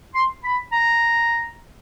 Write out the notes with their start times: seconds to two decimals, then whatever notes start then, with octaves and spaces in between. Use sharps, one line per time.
0.15 C6
0.44 B5
0.72 A#5